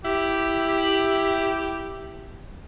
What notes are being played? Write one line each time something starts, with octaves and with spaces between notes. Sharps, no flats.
E4 G4